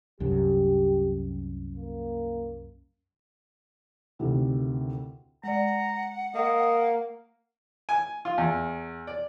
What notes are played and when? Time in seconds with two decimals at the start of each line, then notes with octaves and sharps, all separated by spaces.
0.20 C2 F#2 G4
1.77 A#3
4.19 D2 A2 C3 D#3
5.44 G#3 D5 F#5 A#5
6.35 A#3 D#5
7.89 G#5
8.25 F4
8.38 E2
9.07 D5